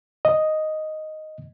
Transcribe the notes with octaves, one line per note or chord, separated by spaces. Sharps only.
D#5